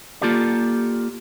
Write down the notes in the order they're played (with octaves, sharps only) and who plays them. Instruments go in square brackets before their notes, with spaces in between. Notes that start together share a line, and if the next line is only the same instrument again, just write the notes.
[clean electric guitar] A#3 F4 G4 A4 D5